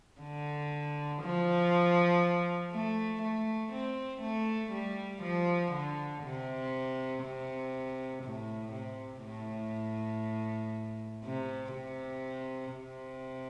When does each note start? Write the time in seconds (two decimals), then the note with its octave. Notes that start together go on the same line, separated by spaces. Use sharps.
0.21 D3
1.22 F3
2.72 A3
3.22 A3
3.73 C4
4.22 A3
4.72 G3
5.23 F3
5.72 D3
6.23 C3
7.23 C3
8.23 A2
8.73 C3
9.23 A2
11.24 C3
11.73 C3
12.74 C3